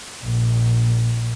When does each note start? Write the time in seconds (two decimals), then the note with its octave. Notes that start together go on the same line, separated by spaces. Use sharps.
0.23 A#1 A#2